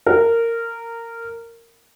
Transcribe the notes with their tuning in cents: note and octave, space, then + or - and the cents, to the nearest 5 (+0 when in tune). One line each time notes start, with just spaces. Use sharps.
A#4 -15